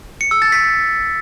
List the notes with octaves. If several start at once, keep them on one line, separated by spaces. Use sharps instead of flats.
C#7
E6
A6
B6